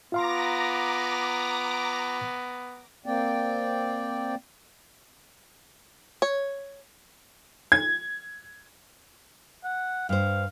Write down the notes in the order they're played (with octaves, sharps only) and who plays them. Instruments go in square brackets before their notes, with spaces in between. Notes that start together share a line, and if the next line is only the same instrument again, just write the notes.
[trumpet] B3 [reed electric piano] F4 F5 C6 [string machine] A#5 D6 A#6
[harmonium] A#3 C4 D5 G5
[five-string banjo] C#5
[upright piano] G#6
[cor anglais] F#5
[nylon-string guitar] G2 C5 [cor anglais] F5